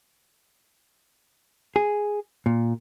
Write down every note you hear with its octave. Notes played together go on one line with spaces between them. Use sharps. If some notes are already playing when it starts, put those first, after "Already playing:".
G#4
A#2